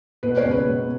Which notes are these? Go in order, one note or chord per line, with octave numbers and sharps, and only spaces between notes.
B2 B4
C#5
C#2
B4
B2